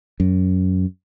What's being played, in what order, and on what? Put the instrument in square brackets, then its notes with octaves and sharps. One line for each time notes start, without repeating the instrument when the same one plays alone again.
[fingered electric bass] F#2